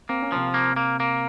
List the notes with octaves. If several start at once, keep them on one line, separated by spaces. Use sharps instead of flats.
A#3 C4
C#4
C3 F3 C4
A#3
A#3
A#3